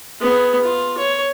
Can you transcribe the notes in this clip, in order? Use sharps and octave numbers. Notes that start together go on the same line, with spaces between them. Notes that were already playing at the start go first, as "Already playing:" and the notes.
B3 G#4
F4
C#5